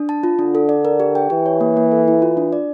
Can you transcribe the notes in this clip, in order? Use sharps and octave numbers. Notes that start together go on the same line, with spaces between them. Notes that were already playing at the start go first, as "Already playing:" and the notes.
Already playing: D4
A5
F4
D3 D4
A4
D5
A#4
G4
G5
E3 G4
C#5
A#3
A#3
A4
E4
F4
D4
D5